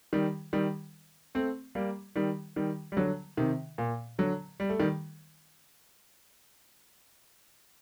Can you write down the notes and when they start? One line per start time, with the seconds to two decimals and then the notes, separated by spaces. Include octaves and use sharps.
0.13 D#3 G3
0.53 D#3 G3
1.35 A3 C4
1.75 G3 A#3
2.16 D#3 G3
2.56 D#3 G3
2.92 G3
2.97 D3 F#3
3.37 C3 D#3
3.78 A#2
4.19 D3 F#3
4.60 G3
4.69 A3
4.79 D#3 G3